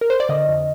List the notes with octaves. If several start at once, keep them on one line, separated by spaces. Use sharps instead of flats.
A#4
C5
D5
D3 D#5
F2